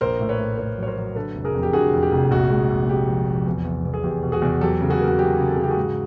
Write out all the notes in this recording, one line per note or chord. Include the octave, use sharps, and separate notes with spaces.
A#1 A#4 C5
A2
B4 C#5
A2
A2 B4 C#5
F#3 C#5
A#4 C5
F#3
D3 A4 B4
F1
G#4 A#4
F2
G4
D3 F#4 G#4
F2
G4
F1
A#1 F#4
G#3
A#1
G#3 G4
F3
F3
E2
E2
E2
G#4
E2 G4
B2
F#4 G#4
E2
F#3 G4 A4
C#3
F#4 G#4
A#3
F#4
F#3 G4
C#3
A4
C#3 G#4
G4
F#4 G#4
G#2